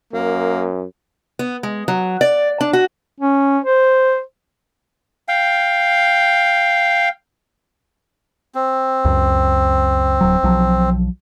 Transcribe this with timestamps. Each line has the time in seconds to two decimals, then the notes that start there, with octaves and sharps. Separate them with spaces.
0.13 F#2 A#3
1.39 B3
1.63 G#3
1.88 F#3
2.21 D5
2.61 D4
2.73 F#4
3.21 C#4
3.65 C5
5.28 F5 G5
8.55 C4
9.05 C#2 F#2
10.21 D1 F#3
10.43 B1 F3 F#3